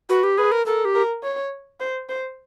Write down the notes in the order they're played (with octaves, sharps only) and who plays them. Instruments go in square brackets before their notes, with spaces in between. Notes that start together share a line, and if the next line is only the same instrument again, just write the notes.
[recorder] F#4 [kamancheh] B4
[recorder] G4
[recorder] G#4 [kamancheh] B4
[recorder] A#4
[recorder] A4 [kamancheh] A#4
[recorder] G4
[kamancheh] A#4
C#5
C5
C5